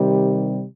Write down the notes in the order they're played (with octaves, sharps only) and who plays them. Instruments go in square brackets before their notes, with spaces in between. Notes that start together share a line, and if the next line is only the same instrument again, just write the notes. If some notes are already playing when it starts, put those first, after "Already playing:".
Already playing: [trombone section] C3 D#3 G3